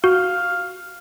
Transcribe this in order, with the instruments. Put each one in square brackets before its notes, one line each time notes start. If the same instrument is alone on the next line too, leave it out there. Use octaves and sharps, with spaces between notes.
[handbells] F#4 [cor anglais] F5